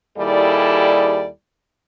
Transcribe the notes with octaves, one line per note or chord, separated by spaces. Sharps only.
D#2 G3 E4 G#4 A4 D5